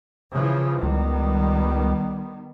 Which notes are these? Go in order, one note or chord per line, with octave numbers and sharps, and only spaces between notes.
C#3 E3 F3
C#2 D#3 G3 B3